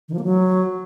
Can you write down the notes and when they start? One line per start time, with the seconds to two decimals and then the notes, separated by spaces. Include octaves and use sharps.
0.09 D#3
0.14 F3
0.19 A#3
0.24 F#3